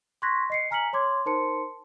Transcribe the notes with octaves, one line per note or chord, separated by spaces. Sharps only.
C6 C#6 F#6 G#6 A#6 B6
D#5 C7 C#7
G#5 A#5 F6 B6 C#7 F#7
C#5 C6 D6 G#6
D#4 A#4 C5 A5 C6 C#7